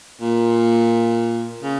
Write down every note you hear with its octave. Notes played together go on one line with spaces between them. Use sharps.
A#2
C#3